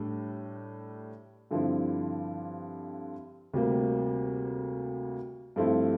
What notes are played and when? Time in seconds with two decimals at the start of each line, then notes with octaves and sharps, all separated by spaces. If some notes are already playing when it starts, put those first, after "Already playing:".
Already playing: A2 G3 D4
1.51 G2 D3 F3 C4 E4
3.54 D2 C3 G3 A#3
5.56 G2 F3 A3 C4 E4